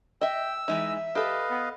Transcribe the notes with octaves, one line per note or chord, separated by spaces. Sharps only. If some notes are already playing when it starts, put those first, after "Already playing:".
D#5 E5 G5 E6
E3 G#3 D#4 E5
G4 A4 B4 D#5 F5
B3